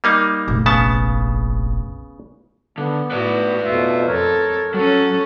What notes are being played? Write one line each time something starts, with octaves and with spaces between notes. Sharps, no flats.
G3 A#3 D#4
F1 A#1
C#3 B3 A5
D3 B3
A2 E4 F#4 B4 D5
F2 B2 F4 E5
F2 A4 A#4 C#5
F#3 C#4 F#4 A4